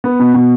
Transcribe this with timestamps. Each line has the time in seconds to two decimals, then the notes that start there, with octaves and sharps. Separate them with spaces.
0.04 B3
0.20 B2
0.34 B2